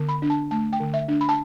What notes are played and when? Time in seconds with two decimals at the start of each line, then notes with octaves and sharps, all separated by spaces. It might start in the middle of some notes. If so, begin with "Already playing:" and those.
Already playing: D3 B3
0.09 B5
0.22 D4
0.30 A5
0.51 A3 A5
0.73 G5
0.80 D3
0.94 E5
1.08 D4
1.21 B5
1.29 A5